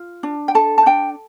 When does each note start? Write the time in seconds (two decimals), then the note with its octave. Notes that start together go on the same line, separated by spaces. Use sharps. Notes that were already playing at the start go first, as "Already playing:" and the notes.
Already playing: F4
0.23 D4
0.48 G5
0.55 A4 A5
0.78 A5
0.86 D4 G5